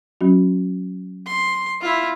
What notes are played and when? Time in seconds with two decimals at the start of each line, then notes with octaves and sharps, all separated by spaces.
0.21 F#3 C#4 F#4
1.26 C6
1.81 E4 F4